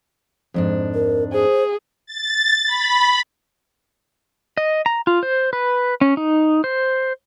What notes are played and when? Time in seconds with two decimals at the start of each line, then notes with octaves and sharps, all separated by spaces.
0.54 F2 G#2 D4
0.94 A#4
1.33 G#4 C5
2.06 A6
2.66 B5
4.57 D#5
4.86 A#5
5.07 F4
5.23 C5
5.53 B4
6.01 C#4
6.17 D#4
6.64 C5